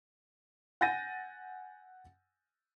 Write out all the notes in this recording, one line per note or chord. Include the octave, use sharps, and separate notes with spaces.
F#5 G#5 G6 A6 A#6 D#7